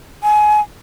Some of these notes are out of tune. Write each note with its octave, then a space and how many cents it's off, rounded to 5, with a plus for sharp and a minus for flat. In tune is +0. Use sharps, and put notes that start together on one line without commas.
G#5 +25